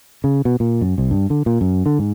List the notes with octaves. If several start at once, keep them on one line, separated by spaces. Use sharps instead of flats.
C#3
B2
A#2
F#2
C2
G2
D3
A#2
F#2
D3
G#2